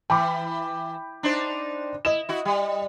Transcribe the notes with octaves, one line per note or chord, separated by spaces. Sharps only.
E3 G5 B5 D6
D4 D#4 C5
E4 D#5 E7
E4 F#4
G3